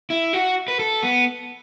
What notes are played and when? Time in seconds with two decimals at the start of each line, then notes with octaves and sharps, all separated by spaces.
0.10 E4
0.33 F#4
0.68 B4
0.80 A4
1.03 B3